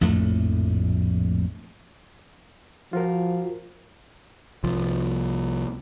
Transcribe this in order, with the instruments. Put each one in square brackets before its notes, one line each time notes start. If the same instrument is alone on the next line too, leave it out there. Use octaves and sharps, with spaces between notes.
[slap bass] A#1 F2 A2 A3
[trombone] F3 [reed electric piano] F4 F#4 A#4
[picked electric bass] C2 F3